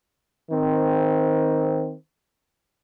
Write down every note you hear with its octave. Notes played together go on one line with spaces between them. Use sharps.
D#3 C4